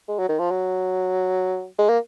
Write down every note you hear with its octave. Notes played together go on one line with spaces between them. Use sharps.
G#3
F#3
D#3
F3
F#3
G#3
A#3